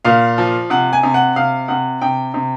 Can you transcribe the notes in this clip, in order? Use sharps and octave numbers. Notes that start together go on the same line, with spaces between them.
A#2 F5
F3
C3 F#5
G#5
C3
F#5
C3 F5
C3 F#5
C3 G5
C3